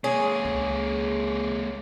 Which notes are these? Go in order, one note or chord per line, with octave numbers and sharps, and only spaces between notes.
G#3 A#3 G#4 C#5
C#2